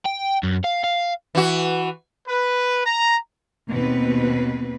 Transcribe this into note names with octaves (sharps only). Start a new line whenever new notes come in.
G5
F#2
F5
F5
E3 F#4
B4
A#5
D#2 B2 C4 B4